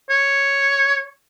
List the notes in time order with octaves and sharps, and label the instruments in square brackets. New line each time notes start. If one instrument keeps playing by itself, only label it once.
[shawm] C#5